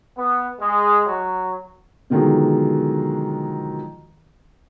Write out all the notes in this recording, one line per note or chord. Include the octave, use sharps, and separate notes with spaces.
B3
G#3
F#3
B2 D3 D#3 F3 F#3 G#3